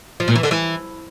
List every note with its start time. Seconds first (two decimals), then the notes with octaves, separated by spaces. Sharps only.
0.20 F3
0.28 A#2
0.35 E3
0.43 D3
0.51 E3